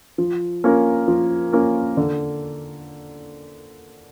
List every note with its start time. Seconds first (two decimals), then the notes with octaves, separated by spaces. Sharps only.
0.18 F3
0.64 A#3 C#4 F4 A#4
1.08 F3
1.53 A#3 C#4 F4 A#4
1.97 D3